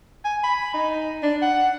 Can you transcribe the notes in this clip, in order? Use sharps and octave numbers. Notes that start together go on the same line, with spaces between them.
G#5
B5
D#4
D4
F#5